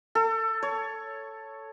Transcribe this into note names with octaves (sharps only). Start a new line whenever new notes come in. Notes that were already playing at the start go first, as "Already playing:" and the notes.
A4
C#5